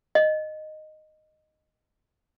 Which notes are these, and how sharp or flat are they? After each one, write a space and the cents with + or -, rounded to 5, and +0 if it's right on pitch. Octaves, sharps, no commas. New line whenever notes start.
D#5 -10